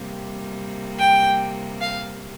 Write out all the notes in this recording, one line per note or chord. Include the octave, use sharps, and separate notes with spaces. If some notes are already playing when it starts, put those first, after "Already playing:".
Already playing: C3 G3 A#3
G5
F5